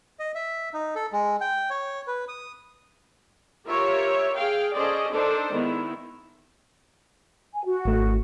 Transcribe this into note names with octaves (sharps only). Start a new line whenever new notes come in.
D#5
E5
D#4
A4
G#3
G5
C#5
B4
D#6
F4 G4 A#4 C#5 E5
G#4 F5 G5
C#4 G#4 A4 C5 D5 D#5
D4 D#4 A4 A#4 C5 D5
D#3 G#3 B3 E4
G#5
F#4
G#1 A3